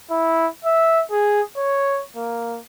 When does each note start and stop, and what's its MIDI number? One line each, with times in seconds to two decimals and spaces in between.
0.10 0.47 64
0.65 1.03 76
1.11 1.41 68
1.57 2.01 73
2.16 2.59 58